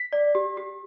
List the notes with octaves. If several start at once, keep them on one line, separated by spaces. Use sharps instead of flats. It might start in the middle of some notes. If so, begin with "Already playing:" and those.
Already playing: B6
D5
G4
G4